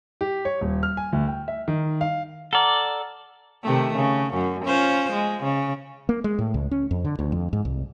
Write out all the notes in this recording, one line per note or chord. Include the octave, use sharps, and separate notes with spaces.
G4
C#5
D#1
F6
G#5
D2
G5
E5
D#3
F5
A4 D5 F#5 A#5 F6
C3 D#3 A3
C#3
F#2
C#4 F4 C5
G#3
C#3
A#3
G#3
A2
C#2
C#4
F2
D3
D2
F2
G#2
C2